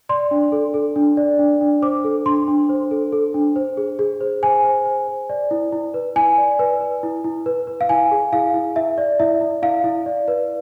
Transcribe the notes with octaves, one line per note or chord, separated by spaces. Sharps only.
D5 C6
D4
A4
A4
D4
D5
D4
D4
C5 D6
A4
D4 C6
D4
C5
A4
A4
D4
C5
G#4
G#4
C5
C5 G#5
C5
C5
C5
D5
E4
E4
B4
E4 G#5
D5
B4
B4
E4
E4
B4
B4
F5
E4 G#5
G#4
E4 F5
E4
E4 E5
D5
E4 E5
E4
E4 F5
E4
D5
B4